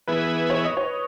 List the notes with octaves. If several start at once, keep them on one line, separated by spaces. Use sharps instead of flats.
E3 B3 E4 G#4 B4
C#5
D#5
C#5